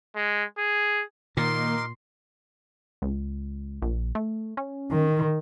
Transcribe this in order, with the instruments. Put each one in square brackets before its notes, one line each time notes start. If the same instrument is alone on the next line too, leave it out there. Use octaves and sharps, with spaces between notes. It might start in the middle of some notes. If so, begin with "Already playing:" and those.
[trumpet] G#3
G#4
[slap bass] A#2 [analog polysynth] D#3 A#3 C7 [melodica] D#4 A#4 D6 [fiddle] C6
[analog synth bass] C#2
A#1
A3
C#4
[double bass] D#3